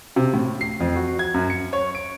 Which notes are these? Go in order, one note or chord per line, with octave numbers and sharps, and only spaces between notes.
C3
A2
C7
F2
F#4
G#6
F#2
C#7
C#5
D7